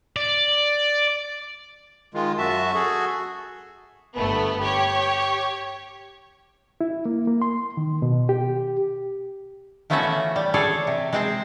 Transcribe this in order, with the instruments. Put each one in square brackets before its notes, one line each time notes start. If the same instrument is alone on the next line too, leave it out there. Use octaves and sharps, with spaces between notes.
[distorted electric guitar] D5
[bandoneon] D#3 G#3 F4
F#2 F#4 E5 A5
F#4 G#4 A4
[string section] G1 A3 B3
G4 C#5
[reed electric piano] E4
A#3
A#3
C6
D#3
B2
G4
[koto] F3 A3 B3 C#4 F#4 E5
E3
G3
G#4 A4 C#5 D5
C3
G#3 C4 C5